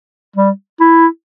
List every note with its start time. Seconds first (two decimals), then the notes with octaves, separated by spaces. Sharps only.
0.36 G3
0.80 E4